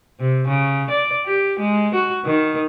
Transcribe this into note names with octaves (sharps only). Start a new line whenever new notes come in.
C3
C#3
D5
G4
G#3
F#4
D#3